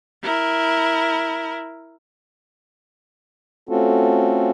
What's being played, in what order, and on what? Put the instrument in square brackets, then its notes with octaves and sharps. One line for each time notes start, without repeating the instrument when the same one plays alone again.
[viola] E4 A#4
[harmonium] A3 C4 C#4 F4 F#4 A4